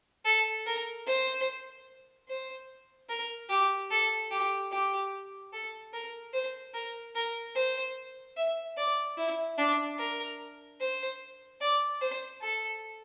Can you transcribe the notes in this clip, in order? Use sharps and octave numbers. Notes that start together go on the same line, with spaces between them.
A4
A#4
C5
C5
A#4
G4
A4
G4
G4
A4
A#4
C5
A#4
A#4
C5
E5
D5
E4
D4
A#4
C5
D5
C5
A4